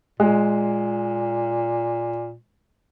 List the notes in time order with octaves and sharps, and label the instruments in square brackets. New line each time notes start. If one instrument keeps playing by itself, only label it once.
[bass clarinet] A#2 [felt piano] G#3